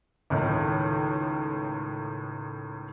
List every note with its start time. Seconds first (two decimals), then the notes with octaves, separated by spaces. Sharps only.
0.30 C#2 A2 D#3